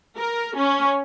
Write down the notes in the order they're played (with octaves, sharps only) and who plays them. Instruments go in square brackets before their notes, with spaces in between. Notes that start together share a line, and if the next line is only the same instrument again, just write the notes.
[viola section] A#4
C#4